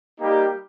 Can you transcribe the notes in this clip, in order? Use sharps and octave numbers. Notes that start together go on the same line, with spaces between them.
G3 A#3 D#4 G4